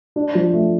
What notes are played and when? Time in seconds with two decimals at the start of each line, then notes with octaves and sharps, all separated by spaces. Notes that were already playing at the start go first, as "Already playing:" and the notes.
0.16 D4
0.35 F3
0.53 A3